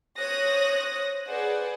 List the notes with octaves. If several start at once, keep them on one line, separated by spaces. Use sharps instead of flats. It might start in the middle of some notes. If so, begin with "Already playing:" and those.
C5 C#5 D#6 F#6 A#6
G#4 B4 C5 D5 F#5